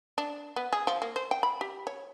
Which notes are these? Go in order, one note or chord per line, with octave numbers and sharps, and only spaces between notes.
D4
B3
G#4
F3
A#3
C5
G5
B5
G4
C#5